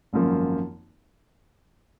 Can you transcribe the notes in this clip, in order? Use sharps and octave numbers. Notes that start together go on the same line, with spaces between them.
G#1 F#2 F3 A#3